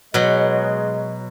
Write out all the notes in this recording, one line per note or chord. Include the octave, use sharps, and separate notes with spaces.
B2 F#3 G#3 D#5